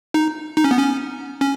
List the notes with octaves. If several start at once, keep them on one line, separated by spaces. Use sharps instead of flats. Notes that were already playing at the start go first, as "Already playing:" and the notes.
D#4
D#4
C#4
B3
C#4
C#4